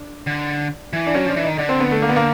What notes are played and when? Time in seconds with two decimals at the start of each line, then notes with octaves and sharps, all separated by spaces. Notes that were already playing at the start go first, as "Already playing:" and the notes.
Already playing: D4
0.27 D3
0.93 E3
1.07 D4
1.14 F#3 C#4
1.26 F3 D4
1.36 E3
1.43 D#3 D#4
1.58 D3 D4
1.69 C4
1.80 B3
1.91 A3
2.02 A#3
2.09 B3
2.16 A#3